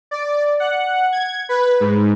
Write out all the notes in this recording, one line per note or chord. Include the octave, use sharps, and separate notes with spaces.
D5
F#5
G#6
B4
G#2